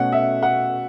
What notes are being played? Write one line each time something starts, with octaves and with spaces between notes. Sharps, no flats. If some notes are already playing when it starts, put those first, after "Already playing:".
Already playing: B2 A3 C#4 F#4 F#5
E5
F#5